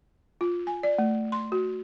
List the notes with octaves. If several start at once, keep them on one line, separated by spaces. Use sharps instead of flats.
F4
G#5
D5
A3
C6
F#4